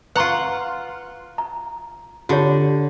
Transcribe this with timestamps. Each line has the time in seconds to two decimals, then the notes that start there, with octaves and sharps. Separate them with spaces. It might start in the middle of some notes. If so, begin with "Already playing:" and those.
0.16 F4 B4 F#5 A#5 C#6
1.38 A#5
2.29 D3 F4 G4 C#5